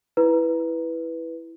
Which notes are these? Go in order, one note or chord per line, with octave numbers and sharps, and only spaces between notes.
E4 B4